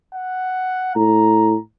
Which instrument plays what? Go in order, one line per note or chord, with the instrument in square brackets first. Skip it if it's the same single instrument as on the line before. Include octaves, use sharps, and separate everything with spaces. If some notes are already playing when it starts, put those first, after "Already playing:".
[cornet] F#5
[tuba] A2 [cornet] A#5